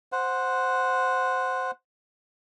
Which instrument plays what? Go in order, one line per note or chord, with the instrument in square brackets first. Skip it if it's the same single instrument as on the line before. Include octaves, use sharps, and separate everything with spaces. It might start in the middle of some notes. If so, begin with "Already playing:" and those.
[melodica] C5 F#5